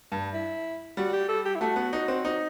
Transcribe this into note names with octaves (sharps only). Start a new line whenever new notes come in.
G2
E4
G3 F#4
G4
A4
G4
E4
A3 F#4
B3
D#4
C4
D#4